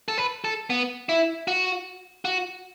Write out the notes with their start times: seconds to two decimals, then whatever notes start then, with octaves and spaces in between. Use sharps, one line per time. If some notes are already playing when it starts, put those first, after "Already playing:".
0.08 A4
0.18 B4
0.44 A4
0.70 B3
1.09 E4
1.47 F#4
2.25 F#4